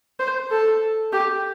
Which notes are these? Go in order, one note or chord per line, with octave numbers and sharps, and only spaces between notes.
C5
A4
G4